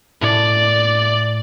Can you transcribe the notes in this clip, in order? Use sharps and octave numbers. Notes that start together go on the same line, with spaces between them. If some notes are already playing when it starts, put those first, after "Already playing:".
A2 D5